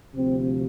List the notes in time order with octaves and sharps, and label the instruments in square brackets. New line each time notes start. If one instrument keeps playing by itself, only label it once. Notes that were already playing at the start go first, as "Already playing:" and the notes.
[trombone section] D2 C3 F3 C4